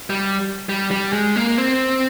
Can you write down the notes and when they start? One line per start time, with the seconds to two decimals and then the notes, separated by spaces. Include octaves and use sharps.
0.10 G3
0.69 G3
0.91 G3
1.13 G#3
1.36 A#3
1.58 C4